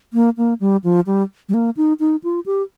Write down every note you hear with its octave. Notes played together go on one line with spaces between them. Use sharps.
A#3
A#3
G3
F3
G3
G3
A#3
D#4
D#4
F4
G4